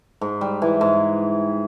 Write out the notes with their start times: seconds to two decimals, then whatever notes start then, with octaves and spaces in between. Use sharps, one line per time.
0.21 G#2
0.41 G3
0.62 E3
0.81 G#2